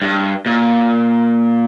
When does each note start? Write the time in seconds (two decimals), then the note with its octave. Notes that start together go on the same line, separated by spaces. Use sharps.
0.02 G2
0.46 A#2